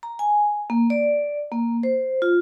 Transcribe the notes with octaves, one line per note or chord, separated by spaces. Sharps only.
A#5
G#5
A#3
D5
A#3
C5
F4